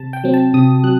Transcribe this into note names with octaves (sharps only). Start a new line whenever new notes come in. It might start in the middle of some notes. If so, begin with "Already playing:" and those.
Already playing: C3 A5
G5
F#3 C4
A5
C3 D#6
F#3 F#6